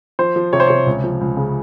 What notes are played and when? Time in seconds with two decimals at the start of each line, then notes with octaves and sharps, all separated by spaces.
0.19 F3 C5
0.36 F3
0.53 C3 C#5
0.60 C5
0.67 C3 C#5
0.86 C#2
1.04 F3
1.21 C#2
1.37 C#3